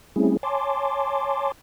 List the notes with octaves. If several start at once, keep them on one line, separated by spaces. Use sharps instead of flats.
G3 A3 C4 C#4 E4 G#4
C#5 G#5 A5 C6 D6